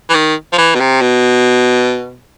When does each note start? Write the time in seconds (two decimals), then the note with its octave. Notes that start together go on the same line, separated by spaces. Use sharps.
0.10 E3
0.15 D#3
0.53 F3
0.58 E3
0.75 B2
0.80 C3
1.02 B2